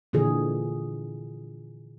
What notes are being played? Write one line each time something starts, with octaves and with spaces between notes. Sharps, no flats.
A#2 D3 E3 G#4